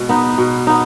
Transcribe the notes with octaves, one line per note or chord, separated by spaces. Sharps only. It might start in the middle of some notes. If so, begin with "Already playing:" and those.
Already playing: B2 G#3
B3 D#4
B2
B3 D#4